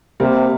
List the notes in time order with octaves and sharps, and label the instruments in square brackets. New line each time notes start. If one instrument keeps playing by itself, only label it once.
[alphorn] C3 [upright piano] G3 A#3